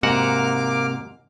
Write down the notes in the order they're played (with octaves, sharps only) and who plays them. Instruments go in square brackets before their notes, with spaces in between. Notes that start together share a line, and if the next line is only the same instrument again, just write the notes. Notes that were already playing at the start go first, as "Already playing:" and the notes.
[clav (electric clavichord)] G#2 F#4 F#5 [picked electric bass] C3 [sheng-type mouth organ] A#3 D6 F6